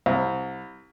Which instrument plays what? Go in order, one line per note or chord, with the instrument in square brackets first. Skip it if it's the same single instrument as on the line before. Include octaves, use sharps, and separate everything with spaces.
[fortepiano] C2